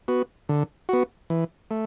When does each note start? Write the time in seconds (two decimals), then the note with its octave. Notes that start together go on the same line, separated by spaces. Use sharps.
0.08 B3 F#4
0.49 D3
0.89 B3 F#4
1.30 E3
1.71 A3